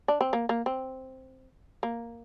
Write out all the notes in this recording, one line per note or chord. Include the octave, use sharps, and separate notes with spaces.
D4
C4
A#3
A#3
C4
A#3